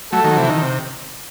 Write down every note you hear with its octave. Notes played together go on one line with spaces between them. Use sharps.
F#3 A3 A4
D#3 F#3
C3 E3
D#3
C3